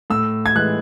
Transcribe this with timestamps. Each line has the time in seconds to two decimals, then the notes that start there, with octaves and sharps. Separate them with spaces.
0.10 A2 E6
0.46 G#6
0.55 E3 G#3 F#6